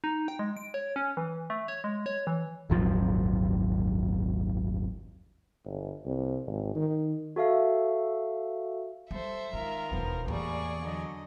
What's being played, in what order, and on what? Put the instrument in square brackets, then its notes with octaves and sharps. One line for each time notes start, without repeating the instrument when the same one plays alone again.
[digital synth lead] D#4
G5
G#3
D7
C#5
C#4
E3
A3
C#5
G#3
C#5
E3
[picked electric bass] D#1 G#1 F#2 F3
[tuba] G1
C2
G#1
D#3
[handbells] F#4 A4 E5 F5
[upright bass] G3 [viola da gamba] A4 C5 [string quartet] E5
[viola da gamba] D#3 F4 A#4 [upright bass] G#3
[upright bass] E1 D#2 [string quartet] F3 B3
[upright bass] E2 [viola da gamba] A2 G3 A#3 [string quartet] G#4 D5 C#6
[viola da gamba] D3 F#3 D#5